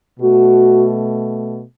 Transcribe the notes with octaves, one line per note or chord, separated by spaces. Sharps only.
B2 A3 F#4